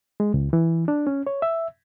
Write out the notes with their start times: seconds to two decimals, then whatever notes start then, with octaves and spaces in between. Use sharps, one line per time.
0.20 G#3
0.34 C#2
0.53 E3
0.88 D4
1.07 C#4
1.27 C#5
1.42 E5